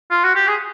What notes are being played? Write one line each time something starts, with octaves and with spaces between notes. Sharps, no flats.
F4
F#4
G4
G#4